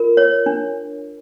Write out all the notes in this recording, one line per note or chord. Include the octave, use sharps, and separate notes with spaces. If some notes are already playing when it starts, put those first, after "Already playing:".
Already playing: F4 A#4
C#5
D4